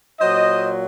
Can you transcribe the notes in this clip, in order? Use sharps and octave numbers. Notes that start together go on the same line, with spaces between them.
A#2 F#3 C5 D#5